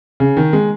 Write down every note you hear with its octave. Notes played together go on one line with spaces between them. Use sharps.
C#3
D#3
G#3